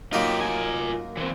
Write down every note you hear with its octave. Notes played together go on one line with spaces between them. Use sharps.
F#2 A#3 D#4 F4 G4
F4 G#5
E3 C4